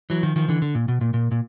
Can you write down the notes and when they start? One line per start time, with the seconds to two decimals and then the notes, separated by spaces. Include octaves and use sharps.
0.10 E3 F#3
0.23 D#3 F3
0.36 D#3 F3
0.48 D3 E3
0.62 D3
0.75 A#2
0.88 B2
1.01 A#2
1.14 A#2
1.31 A#2